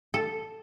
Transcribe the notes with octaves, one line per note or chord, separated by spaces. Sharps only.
A4